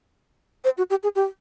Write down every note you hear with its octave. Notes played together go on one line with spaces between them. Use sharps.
C5
F#4
G4
G#4
G4